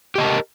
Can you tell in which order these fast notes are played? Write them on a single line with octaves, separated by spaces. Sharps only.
G4 D#5 A5 A#4